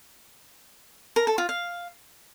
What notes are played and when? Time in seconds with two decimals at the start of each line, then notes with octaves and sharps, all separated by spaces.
1.16 A#4
1.27 A4
1.38 F4
1.49 F5